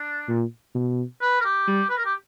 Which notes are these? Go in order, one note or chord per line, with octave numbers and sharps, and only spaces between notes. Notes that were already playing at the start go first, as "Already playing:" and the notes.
Already playing: D4
A#2
B2
B4
A#4
G4
G3
B4
A#4
G4